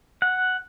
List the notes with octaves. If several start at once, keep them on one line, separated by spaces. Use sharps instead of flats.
F#5